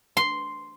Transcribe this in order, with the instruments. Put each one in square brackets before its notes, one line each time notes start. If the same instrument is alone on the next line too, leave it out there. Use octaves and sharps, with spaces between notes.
[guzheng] C6